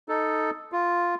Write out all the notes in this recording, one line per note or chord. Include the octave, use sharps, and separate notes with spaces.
D#4 A4
F4